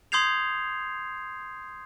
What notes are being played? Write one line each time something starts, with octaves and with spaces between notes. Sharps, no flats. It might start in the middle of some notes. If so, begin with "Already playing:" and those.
C6 D#6 G6 G#6 C7 F7